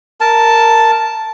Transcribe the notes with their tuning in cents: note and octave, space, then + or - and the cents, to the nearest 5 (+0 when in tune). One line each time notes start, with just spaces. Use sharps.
A#4 -5 A5 +0